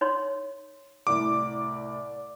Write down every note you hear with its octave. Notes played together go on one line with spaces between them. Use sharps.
D#4 C#5 C6
C2 A2 D5 D6